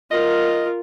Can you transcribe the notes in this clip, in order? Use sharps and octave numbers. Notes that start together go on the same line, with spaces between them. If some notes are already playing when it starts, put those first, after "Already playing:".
F4 A#4 D#5